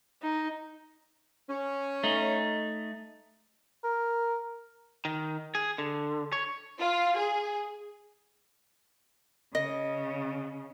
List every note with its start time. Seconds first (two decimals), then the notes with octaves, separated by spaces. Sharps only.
0.22 D#4
1.49 C#4
2.03 A3 D#4
3.84 A#4
5.05 D#3
5.55 G#4
5.78 D3
6.32 C#5
6.79 F4
7.17 G#4
9.55 C#3 D#5